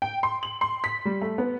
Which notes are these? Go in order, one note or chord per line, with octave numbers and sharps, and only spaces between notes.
G5
C6
F#7
C6
B6
G3
A3
B3